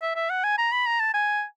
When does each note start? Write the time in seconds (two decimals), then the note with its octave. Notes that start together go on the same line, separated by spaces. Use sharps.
0.02 E5
0.16 E5
0.30 F#5
0.44 G#5
0.58 A#5
0.72 B5
0.86 A#5
1.00 A5
1.14 G#5